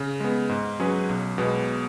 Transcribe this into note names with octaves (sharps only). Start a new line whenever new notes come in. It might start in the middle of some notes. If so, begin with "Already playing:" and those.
Already playing: C#3
G#3 B3
G#2
F#3 C#4 G#4 B4
B1
B2 G#3 B3